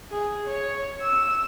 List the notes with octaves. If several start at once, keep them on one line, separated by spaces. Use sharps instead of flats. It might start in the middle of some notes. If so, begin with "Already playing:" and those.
G#4
C#5
E6